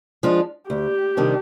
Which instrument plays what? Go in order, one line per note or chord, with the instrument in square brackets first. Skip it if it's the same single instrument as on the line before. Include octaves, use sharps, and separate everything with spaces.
[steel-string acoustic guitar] F3 G#3 D4 F4
[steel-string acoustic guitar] D2 [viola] G4
[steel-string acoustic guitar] C3 D#3 G3 D4